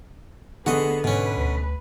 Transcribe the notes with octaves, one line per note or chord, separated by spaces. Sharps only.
D3 B3 F#4 G#4 D#5
G#2 B2 C#4 B4
D2